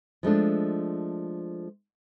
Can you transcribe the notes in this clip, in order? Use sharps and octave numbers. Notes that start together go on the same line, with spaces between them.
F3 G#3 A3 D4